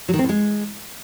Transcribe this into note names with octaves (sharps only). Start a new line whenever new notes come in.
F#3
D#3
C4
A2
G#3